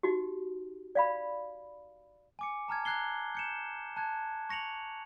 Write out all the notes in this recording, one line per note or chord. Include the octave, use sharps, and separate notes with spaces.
D#4 F#4 G4
D5 F5 B5
G#5 D6 C#7
A5 A#5 F6 G#6
A#5 F#6 G#6 C7 G7
G6 C#7 E7
A5 F#6 G#6
C#6 A#6 C#7 F7 F#7